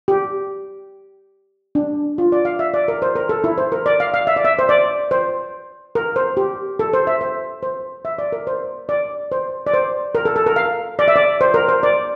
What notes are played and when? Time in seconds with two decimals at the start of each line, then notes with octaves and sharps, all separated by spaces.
0.08 G4
1.75 D4
2.18 F4
2.32 D5
2.45 F5
2.59 E5
2.74 D5
2.88 A#4
3.02 C5
3.16 A#4
3.29 A4
3.44 E4
3.58 C5
3.72 A#4
3.86 D5
4.00 F5
4.14 F5
4.27 E5
4.36 D5
4.45 E5
4.59 C5
4.69 D5
5.11 C5
5.95 A#4
6.16 C5
6.37 G4
6.79 A4
6.93 C5
7.07 E5
7.21 C5
7.63 C5
8.05 E5
8.18 D5
8.32 A#4
8.47 C5
8.89 D5
9.32 C5
9.67 D5
9.74 C5
10.15 A#4
10.25 A4
10.36 A4
10.46 A#4
10.56 F5
10.99 D5
11.08 E5
11.16 D5
11.41 C5
11.54 A#4
11.68 C5
11.83 D5